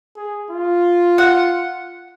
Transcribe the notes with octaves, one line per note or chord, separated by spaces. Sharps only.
G#4
F4
F#5